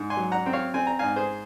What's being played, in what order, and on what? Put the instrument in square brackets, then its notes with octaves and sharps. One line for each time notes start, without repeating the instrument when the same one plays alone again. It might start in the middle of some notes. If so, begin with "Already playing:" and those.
Already playing: [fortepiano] G#2
G#5 C6
F#3
F#5 A#5
C4
C#5 F5
C4 G#5
A#5
G#2 F5 G#5
G#4 C5